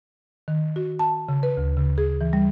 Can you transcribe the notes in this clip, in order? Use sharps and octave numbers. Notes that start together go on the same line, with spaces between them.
D#3
F#4
A5
C#3
B4
D2
C#3
G#4
E3
G3